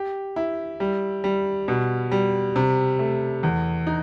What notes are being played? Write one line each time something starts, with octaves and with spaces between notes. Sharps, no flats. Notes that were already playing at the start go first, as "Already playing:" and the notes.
Already playing: G4
E4
G3
G3
B2
G3
C3
A3
E2
D#4